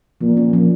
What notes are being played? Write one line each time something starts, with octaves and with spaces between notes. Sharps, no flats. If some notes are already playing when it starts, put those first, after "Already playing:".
A#2 F3
C#4
F3